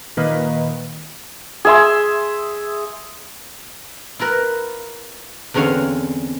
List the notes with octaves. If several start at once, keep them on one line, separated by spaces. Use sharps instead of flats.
A#2 D#3 A#3 B4 D#5 F5
G#4 E5 C6
E4 F4 A#4 B4
E2 D3 C4 C#4 C#5 F5